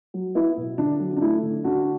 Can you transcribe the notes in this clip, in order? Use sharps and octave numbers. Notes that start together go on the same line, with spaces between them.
F#3
B3 E4
B2
D3 D4
F#3
D4
A3 E4
D3
D3 D4 F#4